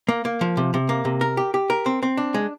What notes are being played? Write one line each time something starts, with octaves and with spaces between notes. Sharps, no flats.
A#3
A#3
F3
C3
C3
A#3
C3
A#4
G4
G4
A#4
C4
C4
D4
G#3